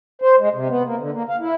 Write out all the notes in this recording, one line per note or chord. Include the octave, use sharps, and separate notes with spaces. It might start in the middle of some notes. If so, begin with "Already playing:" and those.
C5
G#3
C3
B3
A#3
D3
A#3
F5
E4